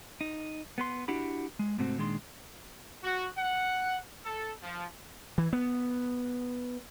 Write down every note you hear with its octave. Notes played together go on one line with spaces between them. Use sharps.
D#4
B3 B4 C6
D4 E4 F#4 G4 B5
G#3
G#2 C3 A3 C4 F#4
A#2 D#3 G#3 D4 C6
F#4
F#5
A4
F3
E3
B3